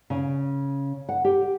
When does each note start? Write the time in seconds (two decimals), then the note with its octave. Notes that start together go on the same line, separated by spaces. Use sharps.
0.10 C#3
1.09 F#5
1.24 G4